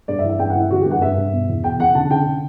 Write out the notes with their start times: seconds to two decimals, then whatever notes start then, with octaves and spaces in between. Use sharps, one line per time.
0.08 G2 D5
0.19 E5
0.24 E3
0.29 E5
0.39 G2 G5
0.50 F#5
0.55 E3
0.60 E5
0.70 D3 F#4
0.81 G4
0.86 G2
0.91 F#5
1.02 G2 E5
1.17 G2
1.32 B2
1.49 E2
1.64 B2 G5
1.79 E2 F#5
1.95 D3 A5
2.10 D3 G5
2.26 D3